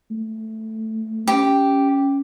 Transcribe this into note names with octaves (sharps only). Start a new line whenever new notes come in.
A3
C#4 G4